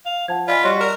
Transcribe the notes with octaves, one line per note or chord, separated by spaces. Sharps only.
F5
F3 F#5 A5 G#6
F4 D5 D#5 G#5 B5
G3 F#4 C#5 D#5 C6
A#4 D5 E7